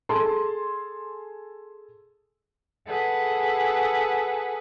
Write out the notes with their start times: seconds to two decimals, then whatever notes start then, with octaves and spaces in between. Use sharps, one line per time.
0.09 G#4 A4 A5 C6
2.87 G#4 A4 B4 F#5